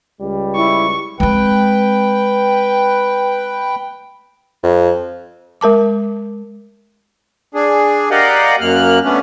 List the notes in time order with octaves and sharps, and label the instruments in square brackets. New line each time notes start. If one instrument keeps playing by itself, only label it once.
[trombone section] C#2 G3
[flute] E4 [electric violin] C#6
[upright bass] G#3 C4 [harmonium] B4 G5
[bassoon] F2
[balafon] G#3 A#4 A5 D6
[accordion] D4 G#4
G4 A#4 D5 D#5 F5 F#5
F#2 A#3 F6 F#6
A3 B3 C#4 D4